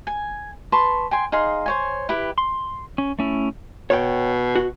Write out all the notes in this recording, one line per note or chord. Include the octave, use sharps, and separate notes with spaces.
G#5
B4 A5 C6 C#6
G5 G#5 C6
D#4 G#4 F5 C6
C5 C#5 G#5
E4 G4 B4
C6
C#4
A3 C#4 E4
B2 C#5 G5
F#4